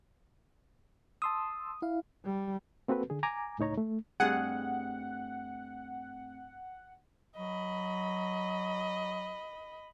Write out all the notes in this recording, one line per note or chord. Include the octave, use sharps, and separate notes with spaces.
A5 C6 D#6 E6
E4 F5
G3
A#3 C4 F#4 A4 B4
D3 G#4
G#5 A#5 D6
C#2 A2 D#4 C#5 A#5
A3
G2 A3 C4 G#4 F#5 G5
F#3 D#5 B5